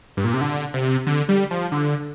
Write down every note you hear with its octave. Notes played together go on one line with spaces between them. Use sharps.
G2
A#2
C3
D3
C3
D3
G3
F3
D3